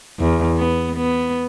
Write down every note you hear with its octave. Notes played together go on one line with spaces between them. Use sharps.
E2
B3
B3